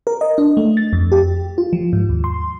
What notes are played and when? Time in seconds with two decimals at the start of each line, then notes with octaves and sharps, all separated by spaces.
0.07 A#4
0.21 D#5
0.38 D4
0.57 A3
0.77 A6
0.93 F2
1.12 G4
1.58 F4
1.73 F3
1.93 G#2
2.09 D#2
2.24 C6